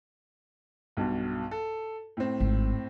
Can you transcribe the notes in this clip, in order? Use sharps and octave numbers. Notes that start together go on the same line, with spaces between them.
B1 G2 B2
A4
A2 C4
G#1